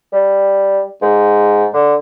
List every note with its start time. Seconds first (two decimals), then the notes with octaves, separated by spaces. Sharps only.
0.12 G3
1.02 G#2
1.73 D3